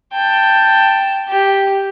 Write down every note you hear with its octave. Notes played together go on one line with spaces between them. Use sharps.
G5 A5
G4